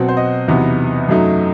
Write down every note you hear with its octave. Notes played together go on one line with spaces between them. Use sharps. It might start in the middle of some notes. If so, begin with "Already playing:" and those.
Already playing: B2 F#3 C4 F#5
C5
D#5
E2 C3 F#3 B3 D#4
F#2 F#3 A3 D#4